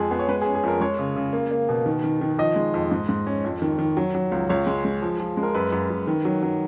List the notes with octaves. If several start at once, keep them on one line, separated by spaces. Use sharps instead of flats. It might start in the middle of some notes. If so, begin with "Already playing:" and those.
Already playing: F2 G#3 G#4
B3 G#4
C#5
G#3 B4
G#4
C#4
G#4
F2 A#4
G#3 C#5
C#3
C#3
A#3
A#3
B2
D#3
D#3
D#3
F3 D#5
G#3
F2
G#2
G#2
C#4
F2
D#3
D#3
F#3
F#3
C#2
C#2 C#5
G#3
G#3
F3
F3
G#3
A#4
F#2 B4
F#2
F#2
D#3
F#3
F#3